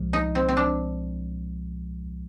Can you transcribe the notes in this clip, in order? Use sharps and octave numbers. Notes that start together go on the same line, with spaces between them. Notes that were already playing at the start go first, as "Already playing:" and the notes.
Already playing: C2 A#2 F3 G#3
D#4
C4
C4
D4